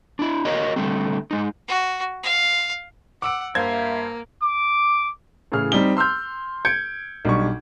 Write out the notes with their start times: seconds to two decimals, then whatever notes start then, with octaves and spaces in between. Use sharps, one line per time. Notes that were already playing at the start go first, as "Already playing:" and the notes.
0.19 D4 E4
0.45 F#4 G4 A#4 C#5 D#5
0.76 D3 G3 A3 C4
1.31 G#3 D#4
1.68 F#4
2.24 F5
3.22 F#5 D6 E6 D7
3.55 G2 A#3 C5 E5 F5 G#6
4.42 D6
5.52 A2 C#3 E3 G#4 F6
5.72 G3 C4 D#4 G4 G7
5.97 C6 E6 F6 G6
6.65 G6 G#6 C#7 D7
7.25 B1 G3 D4 C#6